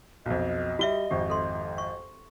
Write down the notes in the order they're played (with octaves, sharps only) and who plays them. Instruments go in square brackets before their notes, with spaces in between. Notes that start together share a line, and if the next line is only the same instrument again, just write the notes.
[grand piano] B1 F2 [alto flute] D#5
[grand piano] G3 G7 [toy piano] F#4 E5
[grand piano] G#1 F2 [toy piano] G4
[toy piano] A4 C6
C#6